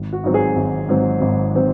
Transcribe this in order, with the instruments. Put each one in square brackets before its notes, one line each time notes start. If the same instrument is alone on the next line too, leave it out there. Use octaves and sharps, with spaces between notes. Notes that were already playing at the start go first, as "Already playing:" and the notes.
Already playing: [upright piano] G#1
F#4
G#2 F#3 C4
G#4
G#1
G#2 F#3 C4
G#1
F#3 C4